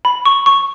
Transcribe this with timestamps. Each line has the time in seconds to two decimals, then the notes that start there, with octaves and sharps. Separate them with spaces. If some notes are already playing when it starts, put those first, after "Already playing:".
0.05 B5
0.26 C#6
0.46 C#6